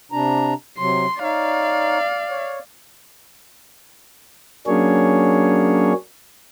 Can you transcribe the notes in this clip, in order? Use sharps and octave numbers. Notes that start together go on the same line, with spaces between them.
C3 D4 A#5
C3 F#3 C6
D#4 C#5 D5 F5
C#5
F#3 A#3 C#4 D4 G#4 C#5